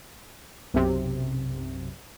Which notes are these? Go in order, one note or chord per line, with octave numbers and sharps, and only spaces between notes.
B1 F#2 C3